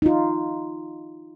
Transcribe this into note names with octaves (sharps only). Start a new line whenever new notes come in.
D#4 F4